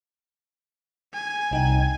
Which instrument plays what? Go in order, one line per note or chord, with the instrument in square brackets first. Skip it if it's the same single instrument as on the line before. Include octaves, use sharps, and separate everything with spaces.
[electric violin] G#5
[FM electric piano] C2 D#4 G5